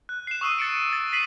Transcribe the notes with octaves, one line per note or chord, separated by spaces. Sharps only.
F#6
C7 E7
C#6 D#6 E6 C7 D#7
A6 C#7 D7
A6
A6 B6 C7 D#7 F#7